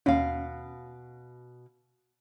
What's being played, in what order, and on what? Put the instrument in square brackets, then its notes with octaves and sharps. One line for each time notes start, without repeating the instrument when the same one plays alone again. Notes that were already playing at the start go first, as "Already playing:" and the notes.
[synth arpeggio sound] D#2 C#4 [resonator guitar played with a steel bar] B2 F5